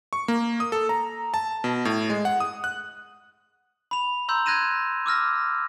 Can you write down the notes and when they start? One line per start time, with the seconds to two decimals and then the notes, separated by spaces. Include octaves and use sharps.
0.13 C#6
0.28 A#3
0.60 D#6
0.72 A4
0.89 A#5
1.34 A5
1.64 B2
1.85 A2
2.10 G#3
2.25 F#5
2.40 D#6
2.64 F#6
3.91 B5 F7
4.29 A#5 C6 E6 G6
4.46 F#6 G#6 A#6 D#7 E7
5.06 D6 E6 F6 A#6